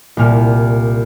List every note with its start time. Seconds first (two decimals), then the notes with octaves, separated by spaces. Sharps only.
0.17 C2 A#2 F6